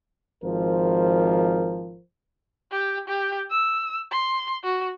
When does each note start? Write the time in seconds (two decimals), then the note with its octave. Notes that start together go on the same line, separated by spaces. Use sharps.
0.44 G#1 F3 A#4 C5
2.71 G4
3.08 G4
3.50 E6
4.11 C6
4.64 F#4